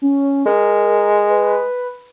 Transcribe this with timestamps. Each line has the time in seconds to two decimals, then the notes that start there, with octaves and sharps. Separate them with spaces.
0.02 C#4
0.46 G#3 A#4
1.30 B4